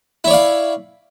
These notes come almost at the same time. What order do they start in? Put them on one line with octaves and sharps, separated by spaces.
E4 C#5 D5 F5